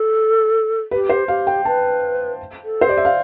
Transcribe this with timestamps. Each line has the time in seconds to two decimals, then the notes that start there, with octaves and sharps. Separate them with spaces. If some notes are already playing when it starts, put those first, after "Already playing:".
Already playing: A4
0.91 G4 B4
1.09 C5
1.28 G4 F5
1.47 G5
1.65 B4 A5
2.64 A4
2.81 C5
2.88 G4 D5
2.97 E5
3.05 F5